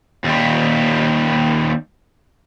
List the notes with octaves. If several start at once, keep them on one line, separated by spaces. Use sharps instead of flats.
D#2 G3